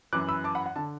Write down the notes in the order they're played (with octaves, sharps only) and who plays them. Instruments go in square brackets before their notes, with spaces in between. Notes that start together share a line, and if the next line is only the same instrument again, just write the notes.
[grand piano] F#2 E3 D6 F#6
B5 E6
A5 D6
F#5 B5
F#5
D3 A5